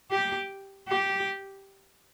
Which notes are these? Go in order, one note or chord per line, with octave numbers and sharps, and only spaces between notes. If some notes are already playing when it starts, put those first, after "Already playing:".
G4
G4